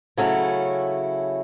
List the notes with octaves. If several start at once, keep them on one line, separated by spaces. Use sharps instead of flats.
C#3 F#3 A3 C#4 E4